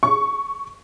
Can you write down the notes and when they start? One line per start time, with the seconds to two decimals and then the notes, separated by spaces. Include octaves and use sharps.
0.03 C#6